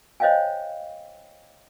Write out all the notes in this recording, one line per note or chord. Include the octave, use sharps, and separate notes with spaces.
C5 C#5 D#5 F5 G5 G#5